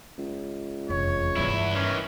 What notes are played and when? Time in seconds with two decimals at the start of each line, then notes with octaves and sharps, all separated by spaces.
0.18 C#2
0.89 F1 E2 C#5
1.36 E2 G2 C#3 E4
1.75 D#3 E3 C#4